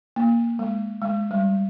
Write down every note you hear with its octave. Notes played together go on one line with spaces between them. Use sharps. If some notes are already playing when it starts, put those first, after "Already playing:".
A#3
G#3
G#3
G3